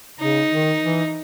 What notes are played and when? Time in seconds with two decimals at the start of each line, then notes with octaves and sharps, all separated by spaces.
0.20 C#3 D#4
0.51 D#3
0.81 E3